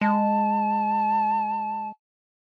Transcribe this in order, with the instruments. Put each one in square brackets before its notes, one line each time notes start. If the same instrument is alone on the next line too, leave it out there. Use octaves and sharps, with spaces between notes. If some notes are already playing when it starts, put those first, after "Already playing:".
[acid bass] G#3 [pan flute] A5